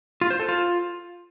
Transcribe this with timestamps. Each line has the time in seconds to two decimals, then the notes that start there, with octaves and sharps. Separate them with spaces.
0.21 F4
0.30 C5
0.40 A4
0.49 F4